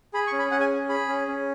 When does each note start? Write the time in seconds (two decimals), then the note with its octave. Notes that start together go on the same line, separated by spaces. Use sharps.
0.14 G#4 B5
0.27 C#6
0.32 C#4
0.39 B5
0.51 C#4 F#5
0.60 G#5
0.70 G#4
0.89 G#4 B5
1.08 C#4
1.28 C#4